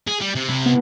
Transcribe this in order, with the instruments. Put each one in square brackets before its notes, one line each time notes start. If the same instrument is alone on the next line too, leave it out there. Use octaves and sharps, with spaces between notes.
[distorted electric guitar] G#4
G3
C3
C3 E4
[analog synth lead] B3